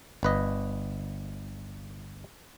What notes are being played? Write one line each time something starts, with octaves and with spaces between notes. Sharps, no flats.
G1 B4 D#5